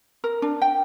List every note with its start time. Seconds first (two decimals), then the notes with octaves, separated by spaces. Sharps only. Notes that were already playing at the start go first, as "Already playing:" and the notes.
0.24 A#4
0.42 D4
0.62 G5